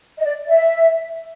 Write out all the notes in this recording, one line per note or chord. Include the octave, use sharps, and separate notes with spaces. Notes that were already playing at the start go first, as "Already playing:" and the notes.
D#5
D5
E5